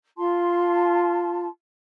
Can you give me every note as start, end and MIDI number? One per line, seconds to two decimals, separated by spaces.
0.17 1.47 65
0.17 1.47 81
0.17 1.47 84